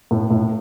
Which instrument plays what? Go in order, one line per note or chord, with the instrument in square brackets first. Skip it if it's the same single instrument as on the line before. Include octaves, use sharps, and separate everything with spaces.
[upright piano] A2
A2